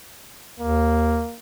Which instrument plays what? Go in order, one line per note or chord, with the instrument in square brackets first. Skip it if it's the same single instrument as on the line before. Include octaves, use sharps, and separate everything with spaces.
[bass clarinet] D#2 [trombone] A#3